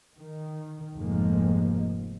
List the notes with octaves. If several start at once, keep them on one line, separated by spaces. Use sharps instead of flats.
D#3
F1 F2 G#2 F3 G#3 A#3